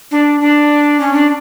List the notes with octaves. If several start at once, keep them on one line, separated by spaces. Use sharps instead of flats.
D4
D4
C#4
D4